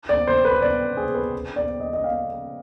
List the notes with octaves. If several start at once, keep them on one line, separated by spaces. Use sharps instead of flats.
D5
C5
B4
D5
G#4
B4
D5
D#5
D#5
F5